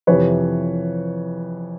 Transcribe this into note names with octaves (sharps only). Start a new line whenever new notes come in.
F2 C3 E3 B4 C#5